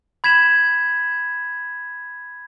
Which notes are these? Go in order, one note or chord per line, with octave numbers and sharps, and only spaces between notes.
B5 G#6 B6 E7 F#7